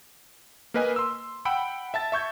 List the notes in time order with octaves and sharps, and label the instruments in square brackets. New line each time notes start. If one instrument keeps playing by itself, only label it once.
[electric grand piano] A#3 A#4 B4 D#5 G#5
C6 E6
F#5 G5 B5 E6 D7
E5 A5 A6
E5 C#6 G6 G#6